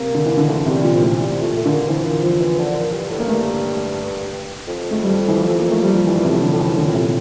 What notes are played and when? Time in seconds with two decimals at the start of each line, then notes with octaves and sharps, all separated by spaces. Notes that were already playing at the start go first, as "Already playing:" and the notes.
Already playing: C3 A#3
0.14 D3
0.26 E3
0.37 D3
0.48 E3 A3
0.66 C3
0.72 G3
0.83 A#2
0.95 F3
1.01 A2
1.19 G3
1.41 A#2 A3
1.57 A3
1.65 D3 A#3
1.88 E3 C4
2.05 A#3
2.23 F3 C4
2.40 E3
2.59 D3
2.75 A#2
2.93 G2
3.10 A2
3.20 A#3
3.28 G2 A3
4.68 F2
4.91 A3
5.03 G3
5.28 E3
5.38 F3
5.59 A#3
5.71 A3
5.82 G3
5.95 F3
6.07 G2 E3
6.24 C3
6.30 A2
6.42 D3
6.53 A2
6.59 E3
6.77 A2 D3
6.86 A#2
6.94 C3